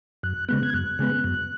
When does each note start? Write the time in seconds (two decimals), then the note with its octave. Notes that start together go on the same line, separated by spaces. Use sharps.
0.23 F#2 F#6
0.49 C#3 G#3 B3 F#6
0.63 G#6
0.74 F#2 F#6
0.99 C#3 G#3 B3
1.24 F#2